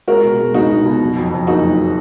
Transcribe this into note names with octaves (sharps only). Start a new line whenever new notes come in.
G#3 F#4 A#4
B2
G#3
C#2 D#4 F#4
B2
B2
F#3
F2
F2
F#1 D#4 F#4
F#3